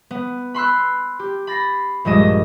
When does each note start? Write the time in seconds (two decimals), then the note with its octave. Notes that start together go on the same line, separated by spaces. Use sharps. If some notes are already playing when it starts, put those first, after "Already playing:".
0.11 B3
0.54 B5 C6 E6 F#6
1.19 G4
1.47 B5 A6 A#6 C7
2.05 A#1 G2 G#3 D#5 E7